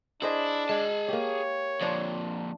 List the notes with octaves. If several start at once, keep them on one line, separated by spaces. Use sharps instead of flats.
D4 E4 G#4 C5 D#5
G#3 G#4 A5
A#3 G4 C#5
F2 A#2 D4 C5 D5